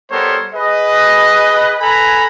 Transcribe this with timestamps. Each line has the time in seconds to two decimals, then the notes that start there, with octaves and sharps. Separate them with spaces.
0.11 G3 B3 A4 A#4 C5 C#5
0.54 G#4 B4 D#5
1.80 A4 B4 G#5 A#5 B5